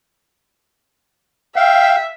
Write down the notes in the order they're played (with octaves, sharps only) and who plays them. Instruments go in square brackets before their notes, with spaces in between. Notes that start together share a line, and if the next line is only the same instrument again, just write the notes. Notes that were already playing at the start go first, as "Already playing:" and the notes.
[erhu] E5 [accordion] F5 [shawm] G5